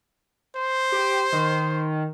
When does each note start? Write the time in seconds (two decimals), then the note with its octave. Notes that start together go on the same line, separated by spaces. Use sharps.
0.56 C5
0.92 G4
1.32 D#3